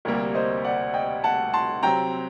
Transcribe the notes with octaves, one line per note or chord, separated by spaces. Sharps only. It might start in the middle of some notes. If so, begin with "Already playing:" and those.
D2 C3 G3 A#3 A#4 D5
C5 D#5
D5 F#5
D#5 G5
F#5 A5
A5 C6
C3 F#3 C4 G5 A#5